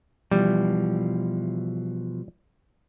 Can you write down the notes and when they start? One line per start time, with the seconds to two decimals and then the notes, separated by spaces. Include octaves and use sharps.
0.31 B2 E3 F3 G3